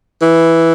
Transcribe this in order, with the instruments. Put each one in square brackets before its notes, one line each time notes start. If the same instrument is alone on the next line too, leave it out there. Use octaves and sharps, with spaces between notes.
[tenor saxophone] E3